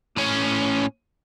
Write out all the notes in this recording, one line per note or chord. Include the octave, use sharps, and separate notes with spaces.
A2 C#4